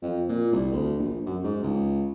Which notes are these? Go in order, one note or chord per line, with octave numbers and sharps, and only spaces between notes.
F2
A#2
C2
D2
A#1
F#2
G#2
C#2